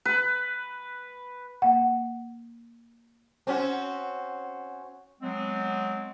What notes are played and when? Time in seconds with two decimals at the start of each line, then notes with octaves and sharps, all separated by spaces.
0.05 B4
1.62 A#3 F#5
3.47 C4 C#4 F#4
5.21 F#3 G#3 B3 C4